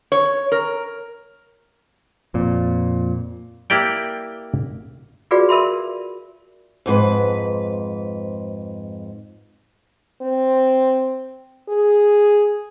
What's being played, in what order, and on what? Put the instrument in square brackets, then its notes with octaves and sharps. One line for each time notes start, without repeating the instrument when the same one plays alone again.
[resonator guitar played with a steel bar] C#5
A#4
[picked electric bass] F2 A#2
[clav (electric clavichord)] A#3 E4 G4 D5 G5
[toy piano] F4 F#4 G#4 B4 D5 F5
A#4 E5 B5 C6
[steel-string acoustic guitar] F2 G#2 B4
[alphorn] C4
G#4